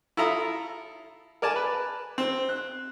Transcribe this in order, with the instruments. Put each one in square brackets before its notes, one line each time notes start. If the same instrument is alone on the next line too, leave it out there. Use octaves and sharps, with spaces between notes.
[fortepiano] E4 F4 A4 A#5 D#6
A#4 D5 G#5 A5
B4
C4
F#6